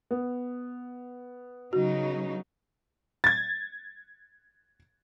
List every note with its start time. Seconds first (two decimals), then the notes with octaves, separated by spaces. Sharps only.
0.11 B3
1.73 C#3 F#3 D#4 F#4
3.24 G#6 A6